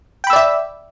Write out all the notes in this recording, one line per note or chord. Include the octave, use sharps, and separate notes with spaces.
D5 E5 G5 B5 E6